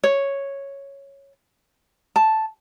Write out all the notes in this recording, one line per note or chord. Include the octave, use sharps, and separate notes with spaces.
C#5
A5